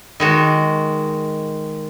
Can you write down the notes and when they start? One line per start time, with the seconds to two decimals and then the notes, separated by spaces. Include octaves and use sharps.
0.20 D#3 G#3 F#4